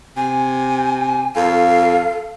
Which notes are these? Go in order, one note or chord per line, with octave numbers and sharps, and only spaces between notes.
C3 G#5
F2 A4 F5